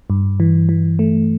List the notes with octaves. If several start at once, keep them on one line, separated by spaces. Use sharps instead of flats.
G2
E3
E3
A3